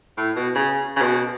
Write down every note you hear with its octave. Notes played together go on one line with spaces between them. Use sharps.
A2
B2
C#3
C#3
B2